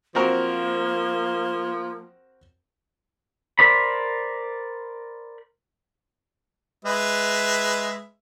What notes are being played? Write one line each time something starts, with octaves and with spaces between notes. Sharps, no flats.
F3 A#3 C4 F#4 A#4
A#4 C5 D5 B5
G#3 B4 E5